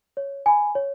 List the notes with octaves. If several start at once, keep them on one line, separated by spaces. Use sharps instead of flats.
C#5
G#5 B5
C#5